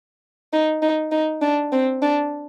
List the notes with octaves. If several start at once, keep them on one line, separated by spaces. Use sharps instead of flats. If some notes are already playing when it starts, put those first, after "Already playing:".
D#4
D#4
D#4
D4
C4
D4